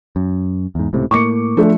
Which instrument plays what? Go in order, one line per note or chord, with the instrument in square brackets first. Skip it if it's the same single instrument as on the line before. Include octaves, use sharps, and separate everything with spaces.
[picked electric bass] F#2
E2 G#2
C#2 A2 C3
[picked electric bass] A2 A#3 [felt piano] C#6 D6 C#7
[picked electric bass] F3 [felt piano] A3 D4